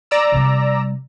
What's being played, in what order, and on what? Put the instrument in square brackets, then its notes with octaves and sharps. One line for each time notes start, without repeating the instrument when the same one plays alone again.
[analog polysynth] D5 A#5 E6
[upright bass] C3 G3